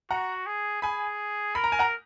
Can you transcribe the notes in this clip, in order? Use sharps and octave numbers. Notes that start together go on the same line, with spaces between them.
F#4 F#5 A#5
G#4
G#4 G#5 B5
A#4 B5
A#5
G#5
F#5 A#5